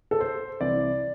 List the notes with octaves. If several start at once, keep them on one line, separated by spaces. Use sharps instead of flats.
A4
C5
C2 C3 E3 D5